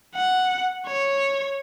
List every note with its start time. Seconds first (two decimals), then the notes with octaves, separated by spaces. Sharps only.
0.16 F#5
0.87 C#5